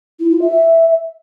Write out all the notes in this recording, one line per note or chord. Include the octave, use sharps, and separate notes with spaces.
E4
F4
E5